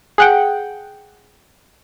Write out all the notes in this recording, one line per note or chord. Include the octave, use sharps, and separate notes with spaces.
G#4 F#5 G5